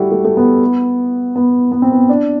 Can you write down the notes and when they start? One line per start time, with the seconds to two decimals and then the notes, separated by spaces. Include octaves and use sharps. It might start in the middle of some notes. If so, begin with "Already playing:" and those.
Already playing: G3 A3 E4 F#4
0.11 A3
0.24 A3
0.37 B3
1.36 B3
1.72 B3
1.82 C4
1.92 B3
2.09 D4